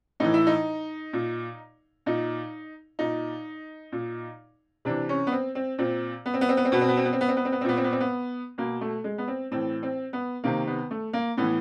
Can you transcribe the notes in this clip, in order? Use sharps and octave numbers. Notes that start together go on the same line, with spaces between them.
A2 E3 D#4
E4
D#4
A#2
A#2 D#4
A#2 D#4
A#2
C3 E3 D4
C#4
B3
C4
C4
A#2 C4
B3
C4
B3
C4
B3
C4
B2 B3
C4
B3
C4
B3
C4
B3
C4
B3
C4
B3
C4
A#2 B3
C4
B3
C4
B3
B2 A#3
A3
G#3
B3
C4
A2 E3 C4
C4
B3
C3 D#3 A#3
B3
A3
A#3
A2 E3 B3